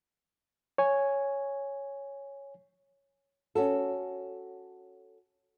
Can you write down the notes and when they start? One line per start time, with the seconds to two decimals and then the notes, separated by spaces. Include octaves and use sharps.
0.78 C#5 G#5
3.55 C#4 F#4 A4